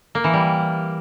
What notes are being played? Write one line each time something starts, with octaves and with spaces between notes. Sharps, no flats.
A#3
E3
G3